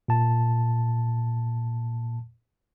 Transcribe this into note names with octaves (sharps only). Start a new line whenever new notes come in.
A#2 A5